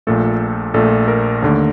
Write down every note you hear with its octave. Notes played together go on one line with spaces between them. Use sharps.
A#1 A#2 A3 A4
A#1 A#2 A3 A4
A#4
D#2 D3 A3